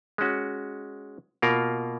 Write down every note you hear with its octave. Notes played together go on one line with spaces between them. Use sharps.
G#3 C#4 F#4
B2 A#3 F4 A#4